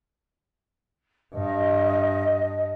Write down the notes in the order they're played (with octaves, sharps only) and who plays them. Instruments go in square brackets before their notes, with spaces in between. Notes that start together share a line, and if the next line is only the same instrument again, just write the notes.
[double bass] G2 [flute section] D#5